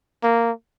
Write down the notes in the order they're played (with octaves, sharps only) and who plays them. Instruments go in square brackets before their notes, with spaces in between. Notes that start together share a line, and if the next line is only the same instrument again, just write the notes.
[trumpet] A#3